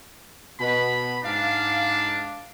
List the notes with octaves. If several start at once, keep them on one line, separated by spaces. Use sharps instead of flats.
B2 B5
G#2 D4 F5